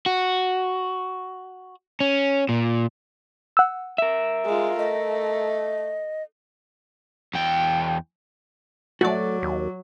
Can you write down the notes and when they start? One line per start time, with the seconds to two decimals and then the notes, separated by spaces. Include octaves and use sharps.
0.06 F#4
2.00 C#4
2.49 A#2
3.57 F#5 E6
3.98 A#4 E5
4.46 G#3 F4
4.79 A3 D#5
7.34 E2 G5
9.01 F#3 A3 F#4 D5
9.42 D#2